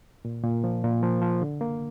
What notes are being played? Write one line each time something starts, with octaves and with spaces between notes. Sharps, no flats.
A#2
A#2
F3
A#2
F3
F3
D3
A#3